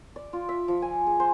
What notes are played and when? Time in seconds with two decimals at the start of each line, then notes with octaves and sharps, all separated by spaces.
0.16 D5
0.33 F4
0.49 E5
0.68 F3
0.82 G#5
1.07 G#4
1.20 C5